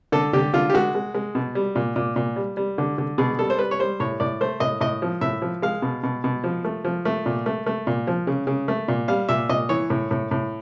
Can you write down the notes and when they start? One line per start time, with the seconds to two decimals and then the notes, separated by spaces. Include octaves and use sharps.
0.12 D3 A4
0.33 D3 G4
0.53 D3 F4
0.70 G4
0.74 G#3 F#4
0.95 G#3
1.15 G#3
1.35 B2
1.55 G3
1.76 A#2
1.96 A#2
2.16 A#2
2.36 G3
2.57 G3
2.78 D3
2.98 D3
3.18 B2 G#4
3.39 G3 A4
3.50 C5
3.59 G3 B4
3.71 C#5
3.79 G3 C5
4.00 A2 C#5
4.20 A2 D5
4.41 A3 C5
4.60 A2 D#5
4.81 A2 D#5
5.02 F3
5.21 A2 E5
5.42 F3
5.62 G#3 F5
5.82 B2
6.03 B2
6.24 B2
6.44 F3
6.64 A3
6.85 F3
7.05 A3
7.26 A#2
7.46 A3
7.66 A3
7.87 A#2
8.07 F3
8.27 C#3
8.47 C#3
8.68 A3
8.88 A#2
9.08 G3 F5
9.29 A#2 E5
9.49 A#2 D#5
9.69 E3 C#5
9.90 A2
10.11 A2
10.31 A2